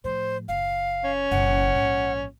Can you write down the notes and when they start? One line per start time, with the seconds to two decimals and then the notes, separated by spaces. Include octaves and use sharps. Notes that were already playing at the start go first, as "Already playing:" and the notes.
0.04 A2 F3 C5
0.48 F#1 F5
1.04 C#4
1.31 F#1 B2 F#5
1.74 A#1 G#2